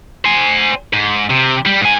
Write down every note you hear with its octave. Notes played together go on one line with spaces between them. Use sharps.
C5 G#5
G#2
C3
G3
G#2 G#5